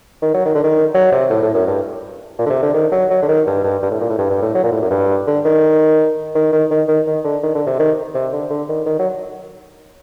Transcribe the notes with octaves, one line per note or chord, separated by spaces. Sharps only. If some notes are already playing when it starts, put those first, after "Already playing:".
D#3
F#3
D#3
D3
D#3
F#3
C3
A2
A2
F#2
G2
A#2
D3
C3
D3
D#3
F#3
F#3
D3
D#3
G2
G2
G2
A2
A#2
A2
G2
G2
A2
F#3
A#2
A2
F#2
G2
D3
D#3
D#3
D#3
D#3
D#3
D#3
D3
D#3
D3
C3
D#3
C3
D3
D3
D#3
D#3
F#3